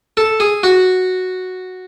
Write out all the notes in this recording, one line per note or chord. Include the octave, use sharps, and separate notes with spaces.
A4
G#4
F#4